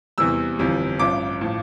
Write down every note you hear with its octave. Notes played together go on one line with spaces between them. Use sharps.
E2 C3 E3 G3 E6
G1 F2 E3 G3
A1 G2 F3 D6
A2 F3